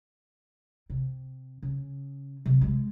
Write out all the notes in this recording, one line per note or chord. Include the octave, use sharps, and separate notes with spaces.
C3
C#3
C3 F#3
G3 G#3